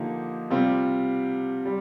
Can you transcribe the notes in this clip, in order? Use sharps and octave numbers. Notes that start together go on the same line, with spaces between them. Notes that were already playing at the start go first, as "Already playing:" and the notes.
Already playing: D3 F3 A#3 D#4 G4
C3 G3 C4 F4
G3